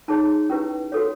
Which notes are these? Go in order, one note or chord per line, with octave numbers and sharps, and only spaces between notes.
D#4 G#4 C#5 A5
C#4 E4 G4 B4
F#4 A4 C#5